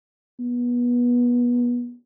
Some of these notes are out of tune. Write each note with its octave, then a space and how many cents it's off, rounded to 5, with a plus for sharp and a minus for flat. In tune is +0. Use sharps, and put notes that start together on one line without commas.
B3 -25